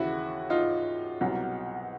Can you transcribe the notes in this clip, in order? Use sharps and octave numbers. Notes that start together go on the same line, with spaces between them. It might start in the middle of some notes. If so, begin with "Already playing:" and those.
Already playing: D#2 C#3 E3 E4 F#4
D#4 F4
C2 B2 F#3